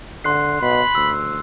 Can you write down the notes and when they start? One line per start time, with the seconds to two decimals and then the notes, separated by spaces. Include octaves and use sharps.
0.24 D3 C6 F#6 C7
0.62 B2 B5
0.95 D2 E6